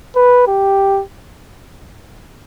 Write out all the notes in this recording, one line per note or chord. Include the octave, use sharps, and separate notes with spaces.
B4
G4